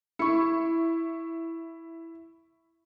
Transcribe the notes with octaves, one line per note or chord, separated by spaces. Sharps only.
E4 C#6 C#7